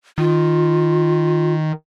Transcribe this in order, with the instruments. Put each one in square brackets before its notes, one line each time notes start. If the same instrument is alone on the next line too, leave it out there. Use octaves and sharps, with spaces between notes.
[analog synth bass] D#3 [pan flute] F4